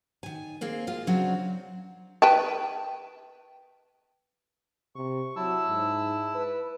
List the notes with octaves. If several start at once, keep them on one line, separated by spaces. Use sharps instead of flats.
D#3 G#5
D#2 A#3 C4 G#4
G#3 F4
C#3 F#3 C4 D4
B4 G5 A5
C3 C#6
F#3 E4 A5 E6
G#2
B4